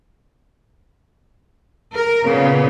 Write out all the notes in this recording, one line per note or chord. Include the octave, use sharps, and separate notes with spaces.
A#4
A#2 C#3 A#3 B3